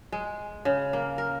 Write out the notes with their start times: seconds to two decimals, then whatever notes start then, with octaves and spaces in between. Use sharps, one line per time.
0.12 G#3
0.65 C#3
0.93 A#3
1.18 A#4